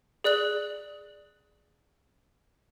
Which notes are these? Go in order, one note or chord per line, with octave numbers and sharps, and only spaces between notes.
G#4 D5 F#6 F#7